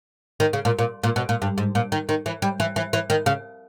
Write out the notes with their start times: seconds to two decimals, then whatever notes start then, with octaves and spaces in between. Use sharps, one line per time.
0.40 D#3
0.53 C#3
0.65 A#2
0.79 A#2
1.04 A#2
1.16 B2
1.29 A#2
1.42 G2
1.58 G#2
1.75 A#2
1.92 D#3
2.09 D#3
2.26 E3
2.42 G3
2.60 E3
2.76 E3
2.93 E3
3.10 D#3
3.26 C#3